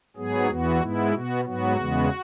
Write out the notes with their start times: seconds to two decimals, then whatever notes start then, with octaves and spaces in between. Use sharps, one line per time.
0.16 G#2 F#3 B3 G#4
0.49 E2 E3 B3 F#4
0.81 G#2 G#3 B3 E4
1.13 B2 B3 F#4
1.45 G#2 F#3 B3 F#4
1.77 E2 C#3 G#3 B3